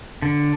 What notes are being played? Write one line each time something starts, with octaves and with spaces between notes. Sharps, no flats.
D3